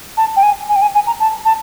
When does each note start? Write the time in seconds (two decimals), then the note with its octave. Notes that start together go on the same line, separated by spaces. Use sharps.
0.17 A5
0.36 G5
0.43 G#5
0.69 G#5
0.76 G5
0.82 G#5
0.95 G#5
1.07 A#5
1.20 A5
1.45 A5